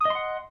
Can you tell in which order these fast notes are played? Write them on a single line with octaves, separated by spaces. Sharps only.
D#6 D#5 C6 F#5